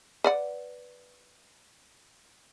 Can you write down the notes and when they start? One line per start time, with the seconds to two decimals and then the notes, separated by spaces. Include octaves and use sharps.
0.24 B4 D5 F#5